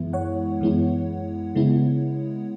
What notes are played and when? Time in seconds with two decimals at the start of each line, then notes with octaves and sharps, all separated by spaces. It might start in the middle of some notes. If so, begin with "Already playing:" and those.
Already playing: F#2 E3 G#3 B3 E4
0.13 C#5 F#5
0.60 F#2 E3 G#3 B3 E4
1.55 C#3 G#3 B3 E4